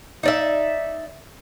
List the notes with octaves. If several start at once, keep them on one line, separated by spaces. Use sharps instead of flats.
D#4 D5 E5